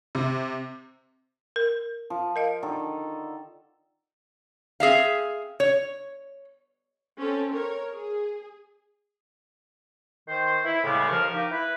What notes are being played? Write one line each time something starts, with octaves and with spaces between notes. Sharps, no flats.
C3
A#4
F3
A#4 D#5 F5
D3 D#3 A4
C4 G#4 E5 F5
C#5
C4 C#4 A4
A#4 C#5
G#4
D#3 C5
E4
A2 C#3 G3 G#3 B3
D#2 F3 A#4 C#6 F6
A#3 D#4 G4
E4 B4